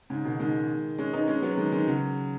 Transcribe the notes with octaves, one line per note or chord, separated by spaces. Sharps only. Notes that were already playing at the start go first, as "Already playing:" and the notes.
G#2 C#3
B2 D#3
D#3 G#3
G#3 C#4
B3 D#4
G#3 C#4
F#3 B3
D#3 G#3
D#3 G#3
C#3 F#3